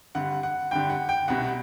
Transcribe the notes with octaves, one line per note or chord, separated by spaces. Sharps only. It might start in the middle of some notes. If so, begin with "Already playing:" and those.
G2 D3 F#5
F#5
G2 D3 G5
F#5
G5
C2 B2 F#5